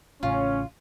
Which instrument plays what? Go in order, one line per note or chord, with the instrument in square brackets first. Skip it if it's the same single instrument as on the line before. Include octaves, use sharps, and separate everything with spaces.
[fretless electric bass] A1 A2 C#3 [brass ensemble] C#4 [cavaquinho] F4